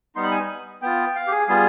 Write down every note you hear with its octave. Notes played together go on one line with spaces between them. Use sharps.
G3 B3 D#4 C6
B5
G#5
B3 F4 G5
F5
G4
G#4
G3 B3 F4 G#4